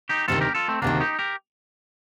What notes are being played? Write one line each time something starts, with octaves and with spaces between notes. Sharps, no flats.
D#4 G4
D2 C3 D#3 F4 A4
G4 A#4
F4 A4
A3 C4
D2 C3 D#3 A#3 D4
D#4 G4
G4 A#4